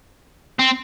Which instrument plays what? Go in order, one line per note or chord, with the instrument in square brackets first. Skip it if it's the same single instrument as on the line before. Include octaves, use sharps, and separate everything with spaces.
[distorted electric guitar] C4